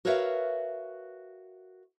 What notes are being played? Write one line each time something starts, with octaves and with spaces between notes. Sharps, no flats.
F#4 A#4 B4 C#5 E5 F5